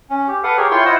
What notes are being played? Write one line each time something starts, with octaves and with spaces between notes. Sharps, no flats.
C#4
G4
A4 B4 F5 F#5
G4 G#4 A#4 C#5
E4 F4 C#5 G5 C6 C#6
E4 F4 C5 D#5 F#5 E6